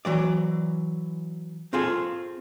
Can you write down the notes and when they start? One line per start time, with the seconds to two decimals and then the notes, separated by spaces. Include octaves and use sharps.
0.05 E3 F#3 D5
1.73 C4 F4 G#4 A4